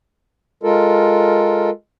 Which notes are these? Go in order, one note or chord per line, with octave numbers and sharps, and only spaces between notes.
G#3 F4 A4 A#4